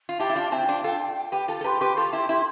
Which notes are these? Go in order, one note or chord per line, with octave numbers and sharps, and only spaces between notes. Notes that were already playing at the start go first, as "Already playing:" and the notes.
F4
E4 G4 A5
E4
D4 F4
C4 E4 G5
D4 F4
F4 A4
G4 B4
G5
F4 A4 A5
A4
G4 B4 C6
G4 B4 D6
F4 A4 C6
E4 G4
E4 G4